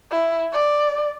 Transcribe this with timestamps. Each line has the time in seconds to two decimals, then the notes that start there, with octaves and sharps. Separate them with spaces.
0.12 E4
0.53 D5